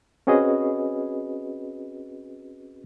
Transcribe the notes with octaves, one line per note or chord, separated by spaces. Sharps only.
C4 C#4 F#4 G#4 B4 D#5